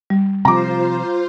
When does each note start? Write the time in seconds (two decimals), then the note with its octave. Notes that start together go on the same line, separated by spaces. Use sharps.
0.10 G3
0.45 C3 F3 F4 C5 A#5 D6